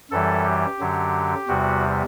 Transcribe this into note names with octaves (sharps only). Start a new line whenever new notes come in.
F#2 E3 G3 A4
G4
F#2 D3 F#3
E2 C3 G3 F#4